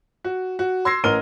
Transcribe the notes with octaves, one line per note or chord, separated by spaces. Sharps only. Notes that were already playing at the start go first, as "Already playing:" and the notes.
F#4
F#4
C6 E6 G#6 A#6 C7
A1 C#4 A#4 F6 D#7 G7